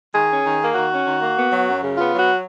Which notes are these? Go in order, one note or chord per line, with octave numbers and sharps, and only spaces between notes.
D#3 G#4
C#4
D#3
A#3
D#3 F#4
C#4
D#3
A#3
B3
F#3
F#2
C#3
B3 F4
F#3
F#4